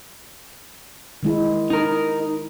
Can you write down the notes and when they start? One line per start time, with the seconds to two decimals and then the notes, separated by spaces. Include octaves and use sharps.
1.23 D#3 G#3 E4
1.70 D#4 A#4